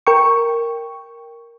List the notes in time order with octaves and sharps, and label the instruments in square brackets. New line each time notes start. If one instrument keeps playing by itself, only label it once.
[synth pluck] A#4 G5 C#6